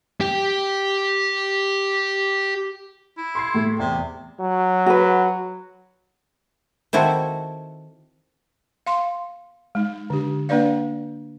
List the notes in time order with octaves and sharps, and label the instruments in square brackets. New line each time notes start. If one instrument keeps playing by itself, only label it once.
[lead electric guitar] G4 G5
[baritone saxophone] E4
[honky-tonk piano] C6 G#6 C7
A2 A3
[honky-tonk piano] E2 [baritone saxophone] C3
[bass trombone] F#3
[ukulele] F#4 B4
[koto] D#3 C4 E4 F#4 A4
[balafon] F5 C6
G#3 D#4
D3 D4 G4
A#3 D4 B4 D5 F5